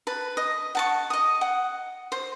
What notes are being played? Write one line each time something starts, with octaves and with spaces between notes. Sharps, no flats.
B4 A5
D#5
F#5 A5 C#6
D#5 D#6
F#5
C5